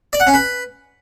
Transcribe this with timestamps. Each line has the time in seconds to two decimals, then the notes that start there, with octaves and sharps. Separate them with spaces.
0.13 D5
0.20 F#5
0.27 C#4
0.34 B4